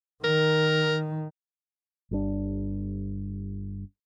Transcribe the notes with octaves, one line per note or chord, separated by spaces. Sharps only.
D#3 A#4
G1 G3 D4